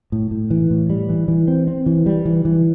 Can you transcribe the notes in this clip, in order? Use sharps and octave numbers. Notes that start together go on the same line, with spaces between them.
A2
A2
E3
A2
G3
E3
E3
C4
C4
E3
G3
E3
E3